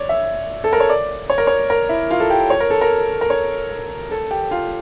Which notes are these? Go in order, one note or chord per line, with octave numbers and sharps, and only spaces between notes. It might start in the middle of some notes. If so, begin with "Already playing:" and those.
Already playing: C#5 D5
E5
A4
A#4
C#5
D5
C#5
A#4
C#5
A#4
E4
F4
A4
G4
C#5
A#4
A4
A#4
A#4
C#5
A4
G4
F4